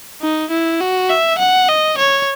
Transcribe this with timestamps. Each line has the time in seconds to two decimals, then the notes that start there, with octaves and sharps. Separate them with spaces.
0.22 D#4
0.51 E4
0.81 F#4
1.10 E5
1.39 F#5
1.69 D#5
1.98 C#5